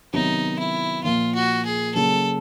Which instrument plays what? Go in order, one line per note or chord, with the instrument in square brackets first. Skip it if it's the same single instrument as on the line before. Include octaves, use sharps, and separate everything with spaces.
[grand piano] C3 D#3 F#3 B3 [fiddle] D#4
[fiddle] E4
[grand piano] A#2 F3 A#3 [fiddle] F4
[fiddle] F#4
G#4
[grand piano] C#3 F#3 A#3 [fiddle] A4